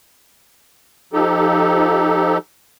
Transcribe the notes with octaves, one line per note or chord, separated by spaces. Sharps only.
F3 D#4 G4 A4